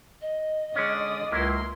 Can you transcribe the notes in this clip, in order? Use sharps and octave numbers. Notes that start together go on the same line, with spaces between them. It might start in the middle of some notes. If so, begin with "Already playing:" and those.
D#5
D3 G#3 C#4 D5 D#6
C#2 F#3 A#3 E4 C6